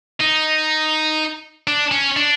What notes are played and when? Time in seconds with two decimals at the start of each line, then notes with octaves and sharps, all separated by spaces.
0.21 D#4
1.67 D4
1.92 C#4
2.17 D4